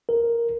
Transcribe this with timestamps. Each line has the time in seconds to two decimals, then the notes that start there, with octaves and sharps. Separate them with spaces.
0.09 A#4